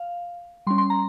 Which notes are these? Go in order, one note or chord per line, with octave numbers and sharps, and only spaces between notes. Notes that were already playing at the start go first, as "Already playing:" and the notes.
Already playing: F5
G3 C#4 C6
C6
A#5